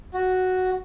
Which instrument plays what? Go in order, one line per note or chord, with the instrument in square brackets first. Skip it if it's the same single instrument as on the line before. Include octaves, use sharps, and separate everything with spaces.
[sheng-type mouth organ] F#4